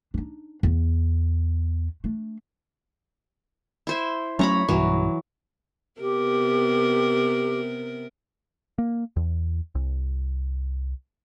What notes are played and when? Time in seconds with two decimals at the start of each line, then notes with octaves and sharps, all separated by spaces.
0.14 D4 D#4
0.63 E2 B3
2.04 A3 D4
3.87 E4 C5 E5
4.39 F#3 A3 C#4 C#5 A#5 B5
4.68 B1 G2 E3 F#3
6.00 C3 B3 G4 A#4
8.78 A#3
9.16 E2
9.75 C2